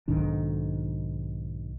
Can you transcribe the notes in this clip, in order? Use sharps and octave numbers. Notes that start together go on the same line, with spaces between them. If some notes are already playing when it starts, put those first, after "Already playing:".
B1 G#2 D#3 D4